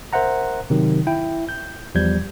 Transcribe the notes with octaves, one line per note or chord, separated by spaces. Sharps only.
A#4 C5 E5 F#5 A#5
C3 D#3 F#3
E4 G5
G6
E2 F3 G3 G6 G#6